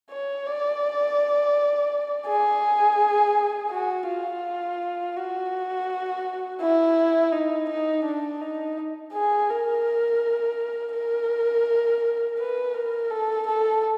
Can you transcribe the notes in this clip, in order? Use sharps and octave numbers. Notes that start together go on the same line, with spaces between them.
C#5
D5
G#4
F#4
F4
F#4
E4
D#4
D#4
D4
D#4
G#4
A#4
A#4
B4
A#4
A4
A4